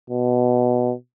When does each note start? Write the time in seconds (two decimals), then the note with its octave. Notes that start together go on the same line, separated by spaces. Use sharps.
0.10 B2